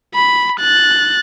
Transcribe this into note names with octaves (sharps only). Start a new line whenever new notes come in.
B5
F#6 A6